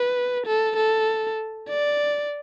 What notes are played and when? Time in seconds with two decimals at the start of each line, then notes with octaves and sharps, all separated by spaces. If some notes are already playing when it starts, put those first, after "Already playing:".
Already playing: B4
0.47 A4
0.76 A4
1.68 D5